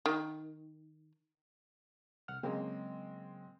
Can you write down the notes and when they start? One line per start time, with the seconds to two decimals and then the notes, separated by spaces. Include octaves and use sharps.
0.06 D#3
2.28 C2 F#5 F6
2.43 C#3 F#3 G#3 A#3 C4